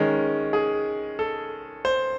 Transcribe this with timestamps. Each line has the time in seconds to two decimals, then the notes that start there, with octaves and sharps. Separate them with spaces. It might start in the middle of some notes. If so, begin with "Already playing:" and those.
Already playing: D#3 G#3 C#4
0.53 G#4
1.19 A4
1.85 C5